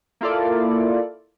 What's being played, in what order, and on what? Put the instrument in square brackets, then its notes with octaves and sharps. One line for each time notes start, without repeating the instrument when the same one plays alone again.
[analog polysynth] A#3 E4 F4 A4 D5